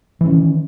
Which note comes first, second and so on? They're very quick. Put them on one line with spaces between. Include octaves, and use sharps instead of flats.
E3 C#4 D#3